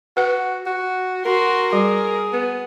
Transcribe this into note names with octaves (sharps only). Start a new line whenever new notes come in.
F#4 B4 F#5
F#4
F#4 A#4 C6
G3 G#4
B3